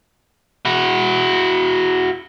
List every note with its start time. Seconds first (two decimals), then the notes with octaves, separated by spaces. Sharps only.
0.65 E4 F#4